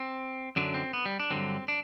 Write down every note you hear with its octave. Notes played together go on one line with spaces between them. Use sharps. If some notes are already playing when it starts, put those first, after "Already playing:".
Already playing: C4
F#2 D3 F#3 D4
C4
B3
G3
D4
G2 D3 F#3 C4
D4